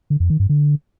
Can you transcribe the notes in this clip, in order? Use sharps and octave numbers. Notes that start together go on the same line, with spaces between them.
D3
F2
D#3
G2
D3